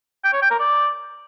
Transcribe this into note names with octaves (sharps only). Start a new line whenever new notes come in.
G5
C#5
G5
A#4
D5